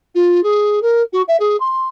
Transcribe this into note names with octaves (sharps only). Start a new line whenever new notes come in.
F4
G#4
A#4
F#4
E5
G#4
C6